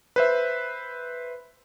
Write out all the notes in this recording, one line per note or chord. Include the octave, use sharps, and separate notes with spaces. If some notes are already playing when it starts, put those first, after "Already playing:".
B4 C5 E5